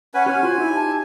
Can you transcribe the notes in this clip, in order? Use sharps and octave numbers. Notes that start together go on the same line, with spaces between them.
C#4 B4 F#5 G#5
C#4 G4 B4 G#5 F6
F4 F#4 C5
D#4 E4 G4
A5